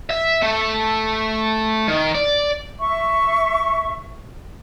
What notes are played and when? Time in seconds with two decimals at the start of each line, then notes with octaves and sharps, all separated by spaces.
0.10 E5
0.42 A3
1.88 D#3
2.15 D5
2.79 E5 C#6